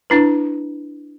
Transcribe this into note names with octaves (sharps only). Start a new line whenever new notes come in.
D4 E4 B4